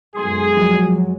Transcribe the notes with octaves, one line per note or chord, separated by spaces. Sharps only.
B1 F#2 G#3 G#4 C6
F3 F#3